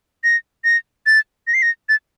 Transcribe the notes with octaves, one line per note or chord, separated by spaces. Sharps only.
A#6
A#6
A6
A#6
C7
A#6
A6